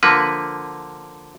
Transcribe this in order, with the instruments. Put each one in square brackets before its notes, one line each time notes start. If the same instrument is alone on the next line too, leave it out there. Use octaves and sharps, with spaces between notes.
[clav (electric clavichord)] D3 F3 A#3 B4